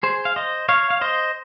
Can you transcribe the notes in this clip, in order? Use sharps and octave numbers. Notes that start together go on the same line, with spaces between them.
G#4 C5
F5
C5 D#5
C#5 F5
F5
C5 D#5